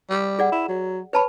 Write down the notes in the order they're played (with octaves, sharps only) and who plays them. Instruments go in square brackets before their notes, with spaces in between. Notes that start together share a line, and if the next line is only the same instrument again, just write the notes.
[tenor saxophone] G3
[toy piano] G#4 D5 F#5
[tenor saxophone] E4
F#3
[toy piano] B4 A5 B5 [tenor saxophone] C#5